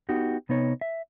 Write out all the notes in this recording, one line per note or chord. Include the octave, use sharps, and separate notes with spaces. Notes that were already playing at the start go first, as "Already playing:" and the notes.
B3 D#4 F#4 G4
C3 B3 D#4 C#5
E5